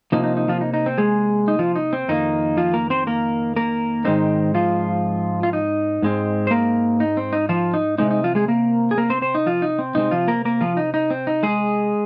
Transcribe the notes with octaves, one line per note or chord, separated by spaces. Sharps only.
C3 F3 A#3 D#4
D#4
D#4
F3 F4
D#4
D#4
C4
G#3 G#4
D#4
F3 F4
D#4
C4
F2 D#3 A#3 D#4
F3 F4
A#3 A#4
C4 C5
A#3 A#4
A#3 A#4
G#2 D#3 G#3 C4 D#4
F3 F4
F4
D#4
G#2 G#3 C4
C5
A#3 A#4
D#4
C4
D#4
F3 F4
D#4
C3 G#3 C4 D#4
D#4
F3 F4
G#3 G#4
A#3 A#4
G#4
A#3 A#4
C4 C5
C4 C5
D#4
F3 F4
D#4
C4
C3 G#3 C4 D#4
F3 F4
A#3 A#4
A#3 A#4
F3 F4
D#4
D#4
C4
D#4
G#3 G#4